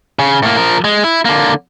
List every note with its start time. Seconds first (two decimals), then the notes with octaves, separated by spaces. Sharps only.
0.19 C#3
0.43 A2 A#3
0.57 F3 A#4
0.84 G#3
1.04 E4
1.25 D3 A#3